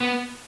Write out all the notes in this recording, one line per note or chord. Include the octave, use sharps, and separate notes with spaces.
B3